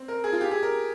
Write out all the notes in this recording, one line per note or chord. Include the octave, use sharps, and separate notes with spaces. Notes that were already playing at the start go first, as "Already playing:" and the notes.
Already playing: C4
A#4
G#4
F4
G4
G#4
A#4